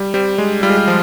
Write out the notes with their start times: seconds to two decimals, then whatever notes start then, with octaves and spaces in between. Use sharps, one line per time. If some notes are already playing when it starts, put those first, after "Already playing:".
Already playing: G3
0.14 G3 C4
0.37 G#3 D4
0.63 G3 F4
0.70 G#3
0.77 G3
0.88 F3